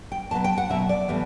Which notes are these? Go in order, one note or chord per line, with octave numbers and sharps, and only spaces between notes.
G5
B2 F#3 B3 A5
G5
F#5
B2 F#3 B3 E5
D5
A2 E3 G3 B3